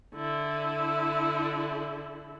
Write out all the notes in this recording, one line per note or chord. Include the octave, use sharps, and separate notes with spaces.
D3 E4